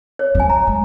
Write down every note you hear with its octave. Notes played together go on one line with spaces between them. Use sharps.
C#5
F3 G#5
A#5
G#3